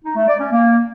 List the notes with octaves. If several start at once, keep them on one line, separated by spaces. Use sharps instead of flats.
D#4
A3
D5
C#4
A#3